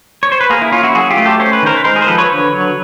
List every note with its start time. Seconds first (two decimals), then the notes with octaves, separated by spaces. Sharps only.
0.23 C#5
0.32 C5
0.41 B4
0.50 A#3 G#4 A#4
0.62 E4
0.72 C#4 F4
0.83 E4 F#4
0.95 F#3 F#4 G#4
1.10 F4 G4
1.17 A3
1.25 G4 A4
1.39 C#4 C5
1.53 B4
1.63 D#3 A#4 C5
1.76 B4
1.84 G#3 A#4 C5
1.96 G#4 A#4
2.02 C5
2.07 F3 A4 B4
2.18 B4 C#5
2.30 D3
2.52 F#3